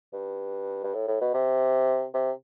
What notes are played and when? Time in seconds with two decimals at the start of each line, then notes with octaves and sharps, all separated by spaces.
0.13 G2
0.84 G2
0.94 A2
1.08 A2
1.21 B2
1.34 C3
2.14 C3